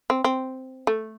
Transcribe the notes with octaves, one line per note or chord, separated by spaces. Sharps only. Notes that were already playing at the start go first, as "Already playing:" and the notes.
C4
C4
A3